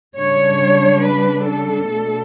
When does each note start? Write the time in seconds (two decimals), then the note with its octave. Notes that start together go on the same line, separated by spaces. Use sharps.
0.16 C#3 G3 D4 C#5
1.03 B4
1.47 A4
1.90 B2 A3 D4